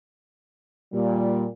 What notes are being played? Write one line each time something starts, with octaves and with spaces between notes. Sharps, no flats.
A#2 G3